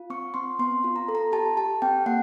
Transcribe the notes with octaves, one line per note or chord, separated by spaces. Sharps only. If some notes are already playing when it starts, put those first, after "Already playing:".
Already playing: F4
C4 C#6
C4 C6
B3 C6
F4
A#5
A4
A#5
G4 A5
G4 A5
C4 G5
A#3 F#5